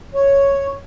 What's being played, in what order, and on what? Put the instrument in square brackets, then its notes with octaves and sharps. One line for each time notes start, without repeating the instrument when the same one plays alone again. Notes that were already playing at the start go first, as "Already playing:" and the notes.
[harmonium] C#5